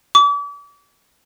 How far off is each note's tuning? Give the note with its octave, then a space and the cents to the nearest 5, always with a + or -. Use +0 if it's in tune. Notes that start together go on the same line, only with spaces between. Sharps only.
D6 -40